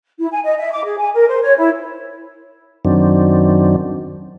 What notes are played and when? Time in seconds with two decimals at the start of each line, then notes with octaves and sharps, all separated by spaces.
0.18 E4
0.31 G#5
0.43 D#5
0.57 E5
0.72 D6
0.84 G#4
0.98 G#5
1.14 A#4
1.27 C5
1.41 C#5
1.57 E4
2.85 F#2 D#3 F#3 C4 D4